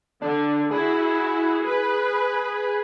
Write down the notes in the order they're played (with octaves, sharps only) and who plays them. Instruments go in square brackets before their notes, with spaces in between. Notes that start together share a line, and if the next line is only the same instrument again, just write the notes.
[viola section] D3 [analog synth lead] D4
[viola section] E4 F#4 [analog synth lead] G#4
[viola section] B4